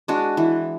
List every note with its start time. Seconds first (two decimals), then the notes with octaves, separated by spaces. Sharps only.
0.08 G#3 D4 F#4
0.37 E3